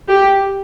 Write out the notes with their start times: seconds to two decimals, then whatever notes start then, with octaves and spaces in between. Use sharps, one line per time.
0.08 G4